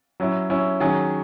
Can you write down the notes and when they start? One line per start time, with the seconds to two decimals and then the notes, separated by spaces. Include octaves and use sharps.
0.20 F#3 C#4 E4
0.50 F#3 C#4 E4
0.80 D#3 F#3 C#4 G#4